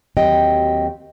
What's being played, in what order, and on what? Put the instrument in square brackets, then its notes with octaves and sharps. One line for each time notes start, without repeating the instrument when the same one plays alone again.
[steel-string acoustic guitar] D#2 F#3 C4 G4 D#5 G5